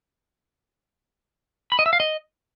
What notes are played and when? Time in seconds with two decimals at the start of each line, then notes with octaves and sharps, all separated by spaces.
1.72 B5
1.79 D#5
1.86 E5
1.93 F5
2.00 D#5